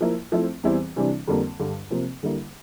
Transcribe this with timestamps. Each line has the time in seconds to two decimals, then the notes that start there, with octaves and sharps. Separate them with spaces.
0.01 F3 A#3 E4
0.32 F3 A3 C4 E4
0.64 E2 E3 G3 C4 E4
0.96 C3 E3 G3 D4
1.28 F2 D3 G3 A#3
1.59 G2 D3 G3
1.91 C3 F3 A#3
2.23 D3 G3 A#3 E4